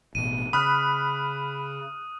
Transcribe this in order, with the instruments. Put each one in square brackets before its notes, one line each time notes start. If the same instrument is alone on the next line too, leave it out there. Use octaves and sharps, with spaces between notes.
[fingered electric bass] A1 B2 [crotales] D#7
[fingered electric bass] C#3 [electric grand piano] B5 F6 F#6 [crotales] D#6